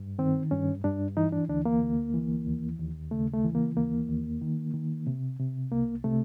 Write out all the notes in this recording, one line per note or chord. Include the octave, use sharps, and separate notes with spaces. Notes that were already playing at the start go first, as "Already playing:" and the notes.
Already playing: G2
D#3 C4
G2 C#4
G2 D4
E3 D#4
D4
D2 D4
A#3
D2
E3
D#2
D#2
C#3 A3
A3
E3
A#3
D#2 A#3
D#2
D#3
D#3
C3
C3
C2 A#3
C3 A3